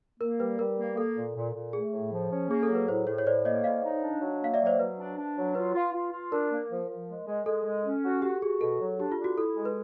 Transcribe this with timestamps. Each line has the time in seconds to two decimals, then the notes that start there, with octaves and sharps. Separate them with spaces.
0.20 A#3 A#4
0.39 G3 B4
0.59 G3 A#4
0.78 A#3
0.97 A#3 A4
1.17 A#2
1.36 A#2
1.54 A#2
1.73 A3 G#4
1.93 A2
2.12 F3
2.32 C#4
2.49 A#3 G#4
2.63 A4
2.69 F#3
2.75 B4
2.88 A2 C5
3.07 A2 C#5
3.18 C#5
3.26 A2 C5 D5
3.45 A#3 C#5 D#5
3.64 A2 D#5 F5
3.84 D#4
4.02 D4
4.21 F#3
4.41 A#3 F5
4.54 D5 E5
4.61 F#3
4.66 C5 D5
4.79 F#3 B4
4.98 D4
5.17 D4
5.37 F#3
5.55 F4 B4
5.74 F4
5.93 F4
6.12 F4
6.32 D4 A#4
6.51 A#3
6.71 F3
6.89 F3
7.09 G#3
7.28 G#3
7.46 G#3 A4
7.66 G#3
7.85 C#4
8.04 F#4
8.22 F#4 G4
8.41 F#4 G#4
8.61 B2 A4
8.80 F#3
8.99 D4 G4
9.12 F4
9.18 D4
9.24 F#4
9.37 E4 A4
9.57 G#3
9.65 B4